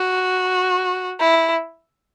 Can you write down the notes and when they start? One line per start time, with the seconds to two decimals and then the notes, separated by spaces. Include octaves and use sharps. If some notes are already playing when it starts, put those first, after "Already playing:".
Already playing: F#4
1.21 E4